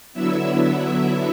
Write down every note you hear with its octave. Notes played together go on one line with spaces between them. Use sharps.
D3 F#3 B3 E4 E5